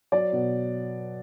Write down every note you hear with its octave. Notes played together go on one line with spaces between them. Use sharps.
F#3 D5
B2